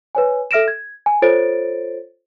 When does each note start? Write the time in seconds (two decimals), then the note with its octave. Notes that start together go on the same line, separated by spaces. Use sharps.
0.15 B4 C#5 G#5
0.51 A4 E5 F6 A#6 D7 E7
0.68 G#6
1.06 G#5
1.22 F4 A4 C5 C#5 A6 D7